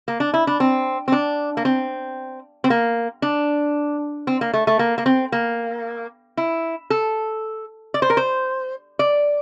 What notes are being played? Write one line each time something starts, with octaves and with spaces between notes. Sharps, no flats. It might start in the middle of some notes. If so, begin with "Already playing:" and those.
A#3
D4
E4
D4
C4
C4
D4
A#3
C4
C4
A#3
D4
C4
A#3
A3
A3
A#3
A#3
C4
A#3
E4
A4
D5
C5
A#4
C5
D5